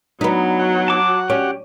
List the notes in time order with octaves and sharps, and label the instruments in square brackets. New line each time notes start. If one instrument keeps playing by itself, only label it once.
[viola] F#3 [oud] B3 D#4
[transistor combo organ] F#4 F#5
[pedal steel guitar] A5 D6
[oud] C#4 [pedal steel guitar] G4